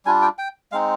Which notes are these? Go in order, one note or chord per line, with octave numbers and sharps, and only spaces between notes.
G3 D4 F4 G#5
G5
G5
G#3 C4 D#4 F5